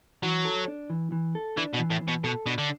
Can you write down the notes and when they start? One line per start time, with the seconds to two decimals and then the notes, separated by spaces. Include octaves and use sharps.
0.23 E3 F#3
0.45 A4
0.68 D4
0.90 E3
1.12 E3
1.35 A4
1.57 E3 D4
1.74 B2
1.79 E3
1.90 A2
2.01 E3
2.08 B2
2.24 B2 A4
2.46 B2 D4
2.58 D3